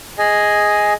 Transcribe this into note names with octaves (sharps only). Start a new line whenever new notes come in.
G#4 D#5 G#5